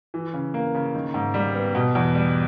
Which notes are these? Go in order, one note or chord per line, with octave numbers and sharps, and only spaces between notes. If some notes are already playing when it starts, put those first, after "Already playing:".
E3
C#3
A#3
C#3
D#3
G#2
G3
B3
B2
E2
G3